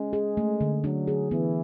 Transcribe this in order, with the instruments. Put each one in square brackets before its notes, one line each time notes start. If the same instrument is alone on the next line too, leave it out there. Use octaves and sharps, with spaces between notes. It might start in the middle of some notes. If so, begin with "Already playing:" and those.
Already playing: [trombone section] G#3 [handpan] C#4
[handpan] G#4
A3
D3
[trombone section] F#3 [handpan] D4
[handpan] G#4
[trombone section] E3 [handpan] B3